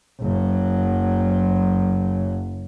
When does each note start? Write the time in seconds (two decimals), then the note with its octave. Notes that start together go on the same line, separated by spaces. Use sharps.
0.20 F#1 F#3